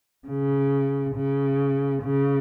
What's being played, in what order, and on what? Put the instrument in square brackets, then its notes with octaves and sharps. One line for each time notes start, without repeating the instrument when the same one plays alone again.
[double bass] C#3
C#3
C#3